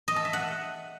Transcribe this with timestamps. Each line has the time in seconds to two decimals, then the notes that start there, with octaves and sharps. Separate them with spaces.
0.08 D#5
0.16 A4
0.25 E5
0.33 F#5